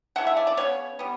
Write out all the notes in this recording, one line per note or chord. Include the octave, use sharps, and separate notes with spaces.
C#3 E3 A3 F#5
E5
D5
D5
C#3 G3 B3 C#5
G3 B3